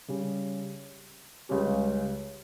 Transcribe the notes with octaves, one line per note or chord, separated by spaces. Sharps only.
C#3 G3 C#4
C#2 C#3 G3 C#4 G4